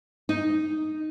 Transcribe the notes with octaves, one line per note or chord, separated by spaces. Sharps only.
D#4